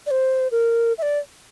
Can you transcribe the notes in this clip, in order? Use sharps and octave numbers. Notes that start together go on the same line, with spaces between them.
D5
C5
A#4
E5
D5